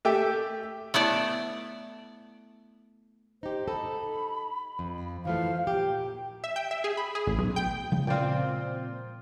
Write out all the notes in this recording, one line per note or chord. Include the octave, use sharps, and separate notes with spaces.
A3 G4 E5 G5
A3 B3 E4 D5
D#4 G4 C5
D#4 A4 B5
F2
E3 F3 A3 F5
A#2 G4 G5
E5
G5
E5
G#4
B5
G#4
A1
B1
G5
C#3 F3 G#3
A#2 C4 F4 D5 G5